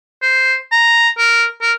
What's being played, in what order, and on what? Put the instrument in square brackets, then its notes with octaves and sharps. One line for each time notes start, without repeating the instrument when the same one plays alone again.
[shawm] C5
A#5
A#4
A#4